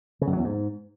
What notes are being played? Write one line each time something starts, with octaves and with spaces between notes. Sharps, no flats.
C#3
F#2
F#3
E2
G#2